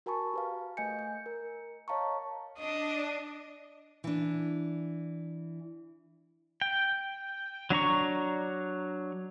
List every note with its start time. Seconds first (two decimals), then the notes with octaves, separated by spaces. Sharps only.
0.06 F#4 A#4 G#5 A5 B5 C#6
0.34 G4 B4 F5
0.77 A3 D#5 G#5 G6 C#7
0.99 G6
1.26 A#4
1.88 C#5 D#5 F5 A5 A#5 C#6
2.59 D4 D#5
4.04 E3 D4
6.61 G5
7.70 F#3 D4 A#5 C#6